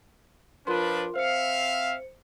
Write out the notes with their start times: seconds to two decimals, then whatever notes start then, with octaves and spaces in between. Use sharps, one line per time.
0.67 F3 D4 F4 A#4 B4 C6
1.16 C4 C5 E5 F5 C#7